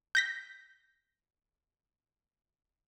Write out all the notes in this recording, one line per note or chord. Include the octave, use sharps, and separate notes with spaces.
G6 A#6 B6